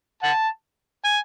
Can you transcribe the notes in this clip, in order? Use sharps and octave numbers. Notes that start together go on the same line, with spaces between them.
F#5 A5
G#5